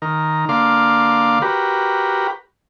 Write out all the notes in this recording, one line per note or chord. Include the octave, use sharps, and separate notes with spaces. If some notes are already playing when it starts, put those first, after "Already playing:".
D#3 A#4
D3 A#3 F5 C6 D6
F#4 G4 A#4 B4